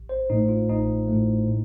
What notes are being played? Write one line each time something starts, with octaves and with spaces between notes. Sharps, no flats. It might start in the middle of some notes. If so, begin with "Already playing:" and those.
Already playing: A1
C5
A2 A3 D#4
F4
A1 D#4
A2 A3
A2